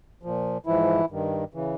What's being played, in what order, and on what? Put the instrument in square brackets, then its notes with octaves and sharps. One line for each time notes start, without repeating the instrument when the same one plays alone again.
[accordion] A#2 F3
G#2 E3 F3 E4
G2 D#3
C#3 E3